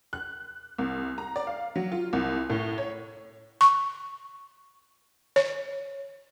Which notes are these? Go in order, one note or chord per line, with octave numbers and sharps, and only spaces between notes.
F#6
C2
A#5
D5
F5
F#3
F4
C2
A2
C#5
C#6
C#5